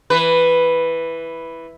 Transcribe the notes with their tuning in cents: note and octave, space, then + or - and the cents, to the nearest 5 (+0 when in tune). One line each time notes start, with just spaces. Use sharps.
E3 +0 B4 +0